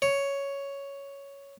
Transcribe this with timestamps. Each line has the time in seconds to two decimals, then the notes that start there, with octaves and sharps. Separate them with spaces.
0.02 C#5